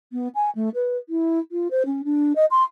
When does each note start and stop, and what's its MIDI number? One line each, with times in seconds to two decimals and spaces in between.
0.12 0.28 59
0.35 0.50 80
0.55 0.69 57
0.75 0.97 71
1.09 1.39 64
1.52 1.68 65
1.71 1.83 72
1.86 2.02 61
2.04 2.35 62
2.35 2.45 75
2.51 2.63 84